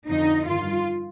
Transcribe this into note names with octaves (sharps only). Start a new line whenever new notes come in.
F2 D3 D#4
G2 D#3 F4